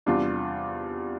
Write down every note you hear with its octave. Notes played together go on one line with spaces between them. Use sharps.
E2 C3 G3 D4 F4